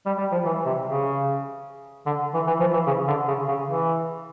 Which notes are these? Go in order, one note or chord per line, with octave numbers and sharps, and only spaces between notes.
G3
G3
F3
E3
C3
C#3
D3
E3
E3
F3
E3
C#3
D3
C#3
C#3
E3